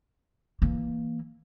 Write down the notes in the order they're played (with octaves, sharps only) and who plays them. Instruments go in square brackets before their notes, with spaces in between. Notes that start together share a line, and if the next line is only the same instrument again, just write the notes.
[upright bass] E3 A#3